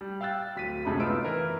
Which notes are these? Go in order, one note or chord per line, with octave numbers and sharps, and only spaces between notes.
G3
F5 G5 E6 F#6 A6
D1 B6 D#7
F#2 C3 G#3 A3 B5
B3 D#4 F4 F5 E6 D7
E3 A#4